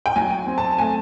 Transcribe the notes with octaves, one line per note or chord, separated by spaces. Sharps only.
G5
F#3 G#5
C4
A5
A3 G#5